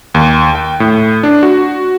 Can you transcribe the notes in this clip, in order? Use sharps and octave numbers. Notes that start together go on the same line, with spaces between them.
D#2
G5
A2
D4
F#4